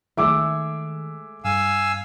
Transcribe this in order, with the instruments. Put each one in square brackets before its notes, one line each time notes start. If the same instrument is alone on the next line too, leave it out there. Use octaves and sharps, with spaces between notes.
[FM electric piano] D#3 [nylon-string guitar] G#3 A3 [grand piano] E5 D6 E6
[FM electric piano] G2 [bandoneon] F5 G#5 E6